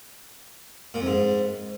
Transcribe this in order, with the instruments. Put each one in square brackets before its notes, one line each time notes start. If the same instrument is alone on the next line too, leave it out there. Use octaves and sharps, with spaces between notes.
[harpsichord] A#2
F2
G#2